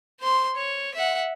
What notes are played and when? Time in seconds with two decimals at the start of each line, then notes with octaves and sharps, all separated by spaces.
0.20 C5 C6
0.56 C#5
0.94 E5 F#5